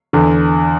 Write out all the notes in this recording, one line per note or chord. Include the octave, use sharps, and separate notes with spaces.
E2 D3